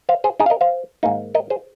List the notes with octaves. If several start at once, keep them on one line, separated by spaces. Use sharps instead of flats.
C5 F5
G#4 C5
D#4 G#4
F5
A#4 D#5
C5 F5
G#2 D#3 A#3 D#4
A#4 D#5
G#4 C5